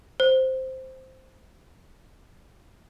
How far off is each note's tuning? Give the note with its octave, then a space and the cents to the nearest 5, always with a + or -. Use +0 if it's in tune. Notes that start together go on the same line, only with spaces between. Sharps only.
C5 +0